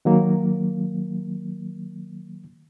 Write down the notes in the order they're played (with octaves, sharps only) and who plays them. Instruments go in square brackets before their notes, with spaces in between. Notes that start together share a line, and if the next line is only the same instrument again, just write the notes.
[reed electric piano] D#3 F#3 A#3